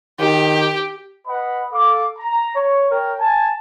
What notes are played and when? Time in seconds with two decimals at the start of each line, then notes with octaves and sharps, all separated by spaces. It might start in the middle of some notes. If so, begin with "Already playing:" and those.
0.20 D#3 G4
1.27 B4 D#5 F#5 B5
1.73 A4 F5 D6
2.18 A#5
2.56 C#5 C#6
2.92 A#4 C#5 G5
3.20 G#5 A5